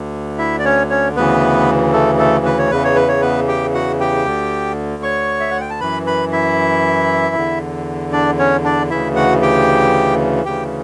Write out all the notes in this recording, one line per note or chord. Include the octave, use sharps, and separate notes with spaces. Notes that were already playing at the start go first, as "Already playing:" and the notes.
Already playing: D2 D3
E4 E5
D5
C#4 C#5
C#4 C#5
D2 C#3 E3 B3 B4
A3 A4
A3 A4
B4
C#5
E2 C#3 E3 B4
C#5
B4
C#5
B3 B4
G4 G5
F#4 F#5
G4 G5
D2 D3
C#5 C#6
E5
F#5
G5
A5
F#2 E3 B4 B5
B4 B5
E4 E5
E2 D3
D4 D5
C#4 C#5
D4 D5
D2 C#3 E3 E4 E5
F#4 F#5
G4 G5
D2 C#3 E3 G4 G5